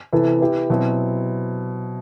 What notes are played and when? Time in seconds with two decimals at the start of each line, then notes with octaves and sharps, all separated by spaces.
0.12 C3 E3 B3 E4 A4
0.41 B3 E4 G4
0.70 B2 F#3 C4 E4